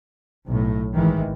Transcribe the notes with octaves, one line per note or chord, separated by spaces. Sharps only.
B1 A2
G#1 D#3 E3 G#3